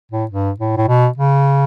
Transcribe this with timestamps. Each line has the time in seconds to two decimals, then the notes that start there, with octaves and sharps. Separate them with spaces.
0.11 A2
0.31 G2
0.59 A2
0.77 A2
0.88 B2
1.17 C#3